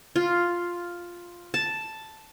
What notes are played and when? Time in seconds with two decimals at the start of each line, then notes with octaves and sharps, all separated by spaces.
0.16 F4
1.54 A5